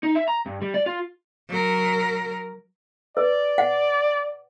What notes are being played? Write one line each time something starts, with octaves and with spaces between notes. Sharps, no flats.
D#4
E5
A#5
G2
G3
D5
F4
F#3 A#4
B4 D5
F#5